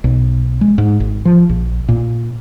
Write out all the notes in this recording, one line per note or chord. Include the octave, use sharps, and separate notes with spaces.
B1
G#3
G#2
G#1
F3
A#1
A#2